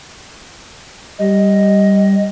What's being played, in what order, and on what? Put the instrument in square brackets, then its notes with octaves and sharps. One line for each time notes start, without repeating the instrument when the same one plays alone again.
[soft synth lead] G3 [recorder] D#5